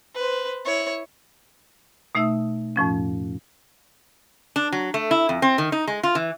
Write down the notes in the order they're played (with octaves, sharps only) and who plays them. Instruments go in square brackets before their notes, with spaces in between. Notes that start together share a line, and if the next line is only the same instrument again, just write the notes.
[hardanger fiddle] B4 C5
E4 C#5
[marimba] B2 A3 D#4 E5 E6
F2 A2 F3 C#4
[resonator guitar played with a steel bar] D4
F#3
A3
E4
F2
C4
D#3
D#4
G#3
F4
E3